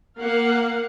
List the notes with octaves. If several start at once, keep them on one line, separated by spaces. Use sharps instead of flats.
A#3 F5 F#5